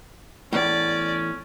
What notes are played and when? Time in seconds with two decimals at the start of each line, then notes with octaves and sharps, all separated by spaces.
0.53 E2 A2 C#4 D5